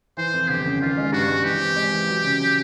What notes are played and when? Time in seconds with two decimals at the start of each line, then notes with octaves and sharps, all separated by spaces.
0.17 E3 C5
0.33 F2
0.49 G1 G4
0.66 C#3
0.81 D#3 F4
0.98 G#3
1.12 G2 F#4
1.28 G#3
1.44 E3 G4
1.60 C4
1.76 G#3
1.92 E3
2.07 F#3
2.24 C#3
2.40 F#3